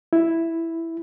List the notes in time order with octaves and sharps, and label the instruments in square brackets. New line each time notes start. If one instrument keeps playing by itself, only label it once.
[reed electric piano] E4